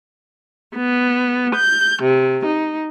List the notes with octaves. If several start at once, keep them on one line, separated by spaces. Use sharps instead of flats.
B3
G6
C3
D#4